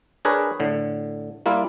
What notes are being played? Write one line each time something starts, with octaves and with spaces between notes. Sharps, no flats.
D4 G#4 A#4 B4 C#5
A2 D3
G3 A#3 E4 F4